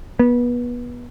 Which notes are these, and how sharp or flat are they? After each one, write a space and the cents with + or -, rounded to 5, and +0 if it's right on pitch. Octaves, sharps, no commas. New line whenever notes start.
B3 -25